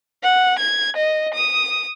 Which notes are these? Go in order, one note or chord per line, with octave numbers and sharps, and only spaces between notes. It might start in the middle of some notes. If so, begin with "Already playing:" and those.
F#5
G#6
D#5
D#6